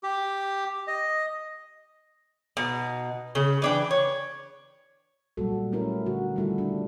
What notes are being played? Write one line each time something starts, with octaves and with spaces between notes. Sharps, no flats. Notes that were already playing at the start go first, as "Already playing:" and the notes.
G4
D#5
B2 D#4
C#3
E3 D4 G5
C#5
A#2 F#3 G3 F#4 A4
A3 C#4 E4 A#4
D3 F#4
D#3 G3 A3 E4 F4 A4
D4